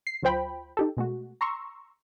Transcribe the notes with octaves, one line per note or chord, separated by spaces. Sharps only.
C7
D2 F#3 F4 C5 G5 B5
D#4 G4 A4
B2 G#3 A3 F#4
A#5 C6 C#6 E6